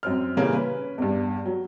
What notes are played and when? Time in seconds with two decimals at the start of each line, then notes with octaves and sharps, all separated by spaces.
0.03 F#2 C4 F6
0.37 A#2 C#3 E3 G3 A#3
0.53 C#4 B4
0.98 E2 G2
1.46 F#3